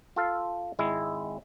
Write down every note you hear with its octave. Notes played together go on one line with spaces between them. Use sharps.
F4 A4 F5
G#1 G#3 E4